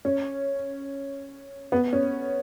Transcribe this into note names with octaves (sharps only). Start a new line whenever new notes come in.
C#4
B3
C#4